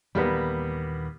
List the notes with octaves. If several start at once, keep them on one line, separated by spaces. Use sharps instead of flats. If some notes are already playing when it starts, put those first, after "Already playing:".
D#2 A#2 E3 G3 A#3 B3